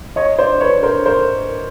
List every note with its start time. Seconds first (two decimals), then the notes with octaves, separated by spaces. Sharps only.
0.16 C#5 D#5
0.39 C5 D5
0.61 B4 C#5
0.83 A#4 C5
1.06 A#4 C5